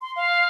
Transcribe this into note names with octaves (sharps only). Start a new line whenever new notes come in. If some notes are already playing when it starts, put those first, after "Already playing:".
C6
F5